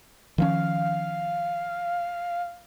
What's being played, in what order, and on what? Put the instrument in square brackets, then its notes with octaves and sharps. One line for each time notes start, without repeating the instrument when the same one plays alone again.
[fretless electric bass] D#3 F3 C#4 [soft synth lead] F5